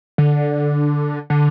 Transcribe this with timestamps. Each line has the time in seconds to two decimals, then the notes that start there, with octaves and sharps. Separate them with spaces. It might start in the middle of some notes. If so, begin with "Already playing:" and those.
0.18 D3
1.30 D3